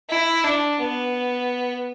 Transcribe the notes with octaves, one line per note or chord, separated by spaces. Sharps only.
E4
D4
B3